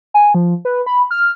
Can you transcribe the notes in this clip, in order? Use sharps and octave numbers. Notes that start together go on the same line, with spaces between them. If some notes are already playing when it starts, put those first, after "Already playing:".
G#5
F3
B4
B5
F6